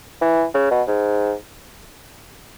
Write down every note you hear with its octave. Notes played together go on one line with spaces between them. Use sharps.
E3
C#3
B2
G#2